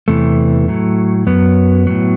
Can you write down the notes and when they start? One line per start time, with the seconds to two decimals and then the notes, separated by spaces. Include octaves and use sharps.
0.08 E2 C3 E3 A3
0.68 A2 F#3
1.27 F#2 F#3 B3
1.87 A2 F#3